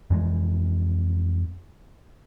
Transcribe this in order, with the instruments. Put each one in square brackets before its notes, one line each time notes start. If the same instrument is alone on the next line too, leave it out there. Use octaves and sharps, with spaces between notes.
[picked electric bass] F2 E3 G#3